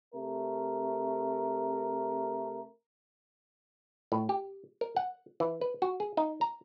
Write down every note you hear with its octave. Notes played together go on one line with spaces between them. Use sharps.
C3 A3 A#4
A2
G4
A#4
F#5
E3
B4
F#4
G#4
D#4
A#5